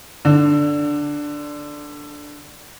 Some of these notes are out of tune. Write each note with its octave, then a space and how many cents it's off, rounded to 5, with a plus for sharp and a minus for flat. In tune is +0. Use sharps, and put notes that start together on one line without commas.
D3 +0 D4 +0